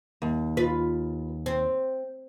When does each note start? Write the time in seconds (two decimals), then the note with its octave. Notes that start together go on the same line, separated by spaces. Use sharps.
0.22 D#2
0.57 F4 B4
1.46 C4